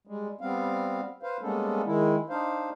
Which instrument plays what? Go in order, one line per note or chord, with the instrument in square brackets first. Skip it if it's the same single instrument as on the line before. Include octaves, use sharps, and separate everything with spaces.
[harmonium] G3 G#3
G3 B3 C4 F5
B4 C5 F5
G3 G#3 A#3 B3 C#4 A4
D#3 G#3 E4
D4 D#4 C5 F5